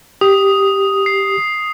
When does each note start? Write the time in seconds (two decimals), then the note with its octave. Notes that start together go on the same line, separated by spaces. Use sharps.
0.21 G4 D#6
1.06 C7